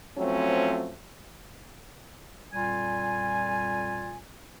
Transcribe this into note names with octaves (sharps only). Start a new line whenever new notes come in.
F3 F#3 A3 C4 C#4
F2 A#2 G3 F4 G#5